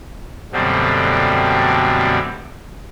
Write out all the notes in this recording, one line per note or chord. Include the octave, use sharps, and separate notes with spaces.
F#2 B2 D3 G3 A3 C4